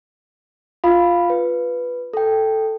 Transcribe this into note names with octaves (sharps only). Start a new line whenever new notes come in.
F4 F5 B5
B4
A4 G5